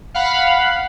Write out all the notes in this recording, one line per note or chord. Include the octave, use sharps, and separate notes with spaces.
F5 F#5 B5